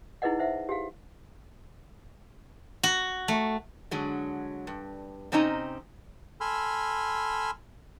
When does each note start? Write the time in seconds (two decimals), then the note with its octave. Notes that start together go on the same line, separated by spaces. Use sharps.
0.22 D#4 E4 G#4 B4 D#5 F#5
0.39 C5 E5 F#5
0.69 G4 G#4 F5
2.83 F#4
3.28 A3
3.91 D3 F#3 G#3
4.67 G2
5.32 C3 C4 C#4 D#4 D#5 A#5
6.41 A4 G#5 B5 C6 E6 F6